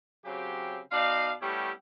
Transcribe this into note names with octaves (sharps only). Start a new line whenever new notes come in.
C#3 F#3 C4 G4
B2 D#4 D5 F5
G3 A3 B3 C#4 E4 G4